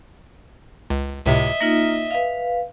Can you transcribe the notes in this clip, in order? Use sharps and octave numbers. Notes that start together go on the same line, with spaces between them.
C#2
C#2 A2 C3 D#5 E5
A#3 D#4 F4 A#6
B4 F5